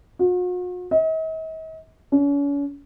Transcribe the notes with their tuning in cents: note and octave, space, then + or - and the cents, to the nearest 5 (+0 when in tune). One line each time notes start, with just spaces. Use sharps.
F#4 -45
D#5 +45
C#4 +40